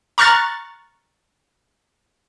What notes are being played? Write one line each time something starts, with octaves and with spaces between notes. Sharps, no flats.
A#5 C#6 F6 F#6 A6